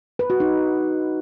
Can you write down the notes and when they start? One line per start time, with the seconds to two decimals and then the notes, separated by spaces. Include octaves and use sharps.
0.19 B4
0.30 F#4
0.40 D#4